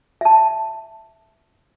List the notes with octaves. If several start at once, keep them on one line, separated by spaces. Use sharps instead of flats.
E5 A5